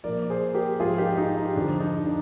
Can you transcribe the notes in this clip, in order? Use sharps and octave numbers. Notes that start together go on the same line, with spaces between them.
A#2 F3 A#4 D5
G#4 C5
G4 A#4
G#2 F3 F4 G#4
D#4 G4
D#4 G4
D#4
F2 D3 F3 D4
D#4
D4